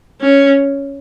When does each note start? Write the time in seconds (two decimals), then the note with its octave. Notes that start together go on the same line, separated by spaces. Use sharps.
0.21 C#4